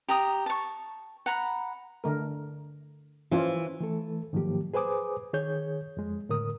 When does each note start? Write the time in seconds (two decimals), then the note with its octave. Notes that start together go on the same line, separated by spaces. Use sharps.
0.08 G4 A#5 D#6
0.46 A5 C#6
1.26 F#5 A#5 B5
2.04 D3 A3 A#4
3.32 E3 F3 C#4 F4
3.81 E3 A3 A4
4.33 G#2 D#3 F3 F#3 A#3 G4
4.74 G#4 B4 C5 G#5 D6 D#6
5.33 D#3 G#4 C#5 G6
5.97 F2 G#3
6.29 A2 D3 A#4 D#6